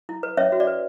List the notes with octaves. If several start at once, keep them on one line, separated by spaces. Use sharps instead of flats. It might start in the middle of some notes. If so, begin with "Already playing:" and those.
E4
B4
C#4 C#5 E5
F#4
D5
B4